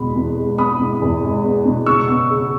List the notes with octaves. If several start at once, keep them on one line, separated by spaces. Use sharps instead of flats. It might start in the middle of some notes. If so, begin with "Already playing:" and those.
Already playing: E2 B2 G#3 B3 B5
E2
G#3
B3 B5 D#6
B2
E2
G#3
B3
B2
C#3 C#6 E6
B3
C#3